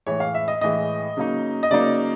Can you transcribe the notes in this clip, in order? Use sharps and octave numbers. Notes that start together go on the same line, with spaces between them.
A2 E3 G#3 C#5
F5
E5
D#5
A2 E3 G#3 D#5
C#3 F#3 A#3 D#4
D#5
C#3 F#3 A#3 D#4 D5